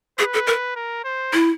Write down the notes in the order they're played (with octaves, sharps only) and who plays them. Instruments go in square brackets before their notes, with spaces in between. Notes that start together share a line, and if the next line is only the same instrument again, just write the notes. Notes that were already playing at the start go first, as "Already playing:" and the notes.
[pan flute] G#4 [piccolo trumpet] B4
[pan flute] A4
A#4
[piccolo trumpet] A#4
C5
[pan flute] E4